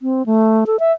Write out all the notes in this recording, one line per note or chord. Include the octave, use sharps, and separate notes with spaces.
C4
A3
A4
E5